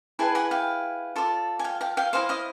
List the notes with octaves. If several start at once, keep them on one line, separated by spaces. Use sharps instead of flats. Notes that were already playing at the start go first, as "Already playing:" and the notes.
E4 G#4 B4 G5 A5
F#5 G#5
F5 G5
F4 A4 D5
G#5
F5 G5
F5 G5
F5 G5
E4 G#4 C5 D#5 F5
D#5 F5